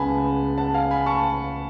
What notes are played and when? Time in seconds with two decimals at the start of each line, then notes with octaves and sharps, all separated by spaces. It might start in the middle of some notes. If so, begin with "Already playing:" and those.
Already playing: C#2 C#3 G#3 B3 F#5 G#5 A5 B5
0.58 F#5 A5
0.74 F5 G#5
0.91 G#5 B5
1.06 A5 C#6